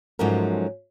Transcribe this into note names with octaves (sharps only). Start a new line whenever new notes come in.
G#2 F3 F#3 A3 C#4 A#4